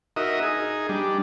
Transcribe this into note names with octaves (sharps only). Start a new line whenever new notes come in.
D#4 F#4 A#4 D#5 E5
D#4 G#4
G3 D4